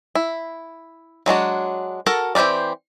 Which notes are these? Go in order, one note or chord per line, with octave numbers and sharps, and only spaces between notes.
E4
F#3 G#3 D4 F#4
F#4 A4 A#4 F#5 A5
E3 C4 G4 A#4 D5